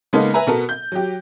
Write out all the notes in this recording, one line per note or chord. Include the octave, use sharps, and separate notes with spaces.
C#3 G#3 A#3 B3 D#4 A4
B4 E5 G#5 A#5
B2 B3 A4 A#4
G6
F#3 G4